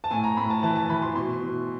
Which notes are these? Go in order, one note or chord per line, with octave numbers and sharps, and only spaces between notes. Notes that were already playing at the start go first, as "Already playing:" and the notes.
A5
A2 G#5
A#5
A2 B5
A5
E3 A5
A5
E3 B5
C6
B2 C6
B2